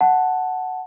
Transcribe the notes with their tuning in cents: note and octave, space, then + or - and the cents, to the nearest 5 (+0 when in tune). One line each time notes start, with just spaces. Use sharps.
F#5 +0 A5 +0